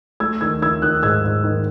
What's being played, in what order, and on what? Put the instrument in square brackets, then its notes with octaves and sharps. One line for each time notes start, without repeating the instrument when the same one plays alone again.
[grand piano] A3 E6 G#6
D#3 E6 G#6
D#3 E6 G#6
D#3 D#6 F#6
G#2 E6 G#6
G#2
D#3